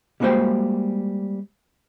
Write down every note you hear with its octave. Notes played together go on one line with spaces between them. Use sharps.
G3 G#3 A#3 F#4 C5 G5